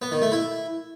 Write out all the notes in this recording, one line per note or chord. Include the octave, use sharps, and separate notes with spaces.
B3
D#3
A3
E4